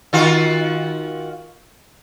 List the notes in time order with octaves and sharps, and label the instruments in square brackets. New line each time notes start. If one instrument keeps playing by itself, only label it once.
[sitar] D#3 F4 F#4